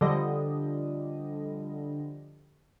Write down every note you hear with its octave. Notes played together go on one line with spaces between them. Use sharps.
D3 F3 G3 D#5